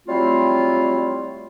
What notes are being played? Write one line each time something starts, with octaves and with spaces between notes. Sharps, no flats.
F#3 G3 A3 C4 E4 F4